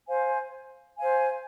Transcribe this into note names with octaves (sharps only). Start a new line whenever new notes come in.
C5 F5 G#5
C5 F5 G#5